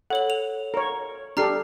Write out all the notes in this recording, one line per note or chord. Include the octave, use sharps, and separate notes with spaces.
A4 C#5 F#5 F#7
F7
A#4 C#5
D4 G4 A4 A#5 F6 C7